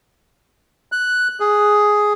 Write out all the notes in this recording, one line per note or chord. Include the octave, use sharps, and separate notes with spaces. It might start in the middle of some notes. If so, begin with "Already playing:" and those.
F#6
G#4